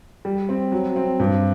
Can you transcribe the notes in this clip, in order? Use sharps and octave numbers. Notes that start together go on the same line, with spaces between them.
G3
C4
F#3
C4
G2